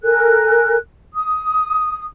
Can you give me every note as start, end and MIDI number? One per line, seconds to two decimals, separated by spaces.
0.03 0.75 69
0.03 0.75 70
0.03 0.75 80
0.03 0.75 90
1.13 2.05 87